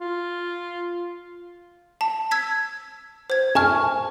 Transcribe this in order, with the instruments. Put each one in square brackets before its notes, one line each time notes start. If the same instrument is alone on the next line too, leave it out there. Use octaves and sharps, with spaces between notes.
[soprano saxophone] F4
[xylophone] A5
E6 G#6 B6
C5 G#6
[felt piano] G#5 [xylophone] A5 C#6 F6